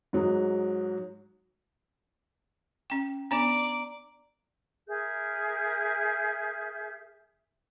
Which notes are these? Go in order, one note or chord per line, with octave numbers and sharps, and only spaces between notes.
G#2 F#3 G#3
C#4 G5
B3 D4 D5 A#5
G#4 A#4 E5 G6